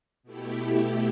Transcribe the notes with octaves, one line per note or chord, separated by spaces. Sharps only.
B2 A3 E4 G4